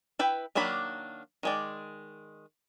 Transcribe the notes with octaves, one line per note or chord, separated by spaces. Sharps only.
E4 B4 G5
D#3 F#3 A#3 D4 B5
D#3 G#3 D5